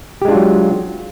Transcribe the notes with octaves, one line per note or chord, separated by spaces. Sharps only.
F#3 G#3 D4 F4 G4